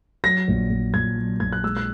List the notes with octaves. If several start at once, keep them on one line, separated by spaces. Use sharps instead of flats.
F#3 A#6
A#1
A#1
A#1 G#6
F#3
A#1 G#6
F#6
G#3 E6
F#6